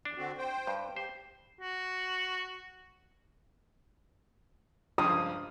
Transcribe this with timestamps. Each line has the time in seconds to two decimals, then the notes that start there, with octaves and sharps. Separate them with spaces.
0.05 E2 D4
0.17 D3 C4 F#4
0.38 C5 G5
0.67 G2
0.96 G4 C5
1.61 F#4
4.98 C#2 G2 F3 D#6